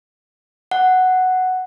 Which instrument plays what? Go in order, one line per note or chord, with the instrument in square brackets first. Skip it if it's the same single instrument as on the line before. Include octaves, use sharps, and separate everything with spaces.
[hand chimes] F#5